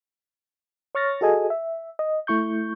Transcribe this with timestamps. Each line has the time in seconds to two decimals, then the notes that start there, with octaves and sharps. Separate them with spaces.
0.95 C#5 C#6 F6 A6 A#6
1.21 F#4 G#4 A4 D#5 G#5
1.50 E5
1.99 D#5
2.27 A3 E4 C#6 G6